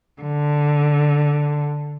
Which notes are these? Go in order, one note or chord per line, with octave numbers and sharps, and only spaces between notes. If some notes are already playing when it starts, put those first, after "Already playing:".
D3